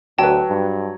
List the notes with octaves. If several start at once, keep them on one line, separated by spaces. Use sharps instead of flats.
D2 F#3 B4 G5 A5
G2